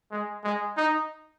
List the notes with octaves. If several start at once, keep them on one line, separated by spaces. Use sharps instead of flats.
G#3
G#3
D#4